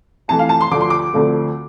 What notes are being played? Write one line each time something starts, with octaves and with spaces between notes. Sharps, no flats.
F2 E3 A3 A5
F5
A5
C6
D2 D3 F3 D6
C6
D6
D2 D3 F3 A3 C4